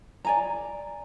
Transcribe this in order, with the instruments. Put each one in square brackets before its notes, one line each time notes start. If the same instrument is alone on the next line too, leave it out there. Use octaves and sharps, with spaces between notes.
[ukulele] D5 G#5 A#5